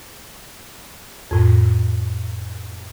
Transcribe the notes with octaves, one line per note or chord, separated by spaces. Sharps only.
F2 A2